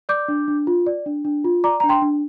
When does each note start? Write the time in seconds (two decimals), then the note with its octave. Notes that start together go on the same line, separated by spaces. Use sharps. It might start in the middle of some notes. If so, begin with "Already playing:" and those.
0.09 D5 D6 G6
0.28 D4
0.48 D4
0.67 F4
0.87 D5
1.06 D4
1.25 D4
1.44 F4
1.64 D5 A#5 D6
1.80 D4 A#5
1.89 G5 C6
2.02 D4